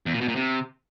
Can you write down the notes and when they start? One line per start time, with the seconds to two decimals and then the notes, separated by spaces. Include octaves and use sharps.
0.06 E2
0.14 A#2
0.21 B2
0.28 A#2
0.36 C3